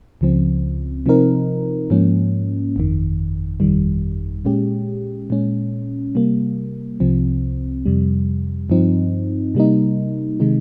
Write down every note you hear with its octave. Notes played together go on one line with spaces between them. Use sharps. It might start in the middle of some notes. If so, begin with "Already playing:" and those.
C#2 C#3 F3 C4
C3 F3 C4 D#4 A#4
G#2 F3 A#3 C#4
G1 F2 D#3
G1 F2 D#3 G3
A#2 G#3 C#4 G4
A#2 G#3 C#4
C3 G3 A#3
C2 C3 F3 C4
F2 C3 G3
G2 F3 C4 D#4
C3 G3 A#3 D#4
C3 D#3 G#3 D#4